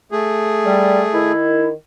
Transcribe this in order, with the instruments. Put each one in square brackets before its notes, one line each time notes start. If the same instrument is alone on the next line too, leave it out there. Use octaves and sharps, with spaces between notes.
[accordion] A3 G#4
[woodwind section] G3
D#3 E4